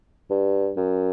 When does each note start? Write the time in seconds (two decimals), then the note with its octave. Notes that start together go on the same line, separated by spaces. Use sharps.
0.30 G2
0.77 F#2